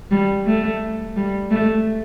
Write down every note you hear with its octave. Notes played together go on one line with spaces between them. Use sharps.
G3
A3
G3
A3